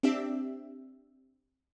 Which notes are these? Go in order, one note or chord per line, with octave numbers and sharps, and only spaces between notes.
C4 D4 G4 E5